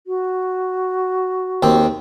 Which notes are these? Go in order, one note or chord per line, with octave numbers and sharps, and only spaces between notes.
F#4
D#2 C4